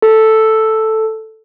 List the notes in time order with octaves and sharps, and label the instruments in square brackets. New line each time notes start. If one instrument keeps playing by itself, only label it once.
[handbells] A4